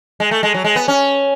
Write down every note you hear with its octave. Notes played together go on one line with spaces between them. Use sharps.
G#3
A3
G#3
F#3
G#3
B3
C#4